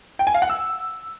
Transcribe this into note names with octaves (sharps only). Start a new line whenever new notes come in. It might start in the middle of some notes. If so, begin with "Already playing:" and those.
G5
G#5
F5
F#5
E6